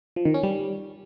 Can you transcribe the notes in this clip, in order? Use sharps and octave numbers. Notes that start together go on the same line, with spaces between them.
F3
D#3
C#4
G3